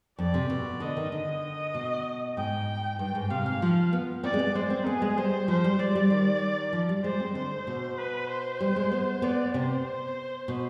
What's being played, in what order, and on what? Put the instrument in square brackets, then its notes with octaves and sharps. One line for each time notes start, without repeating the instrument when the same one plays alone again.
[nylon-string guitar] F2 [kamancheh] D5
[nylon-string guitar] C3
B2
[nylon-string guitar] D3 [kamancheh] D#5
[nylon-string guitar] D#3
[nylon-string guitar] D3 [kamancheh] D#5
[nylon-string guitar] B2
[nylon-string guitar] G#2 [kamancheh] G5
[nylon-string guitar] G2 [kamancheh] G5
[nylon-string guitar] G#2
[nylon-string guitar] C3 [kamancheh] F5
[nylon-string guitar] G#2
F3
B3
[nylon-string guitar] C4 [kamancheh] D5
[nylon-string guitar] G#3
B3
[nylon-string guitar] G#3 [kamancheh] C5
[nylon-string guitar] C4
[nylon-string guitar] B3 [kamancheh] G#4
[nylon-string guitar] G#3
[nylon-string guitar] G3 [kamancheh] C5
[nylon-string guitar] F3 [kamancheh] C5
[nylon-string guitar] G3
[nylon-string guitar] G#3 [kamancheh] D5
[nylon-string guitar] G3
D#3
F3
G3
[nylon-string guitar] G#3 [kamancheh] C5
[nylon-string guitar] C4
[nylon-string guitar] D3 [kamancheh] C5
[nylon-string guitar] B2
[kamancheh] B4
C5
[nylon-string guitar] G3
G#3
B3
[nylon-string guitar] B3 [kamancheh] D5
[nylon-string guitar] C3 [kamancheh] C5
[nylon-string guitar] B2